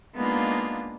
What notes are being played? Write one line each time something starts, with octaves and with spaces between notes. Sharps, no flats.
G#3 A#3 B3 D4 D#4 F4